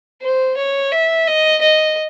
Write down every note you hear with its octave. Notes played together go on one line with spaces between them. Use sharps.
C5
C#5
E5
D#5
D#5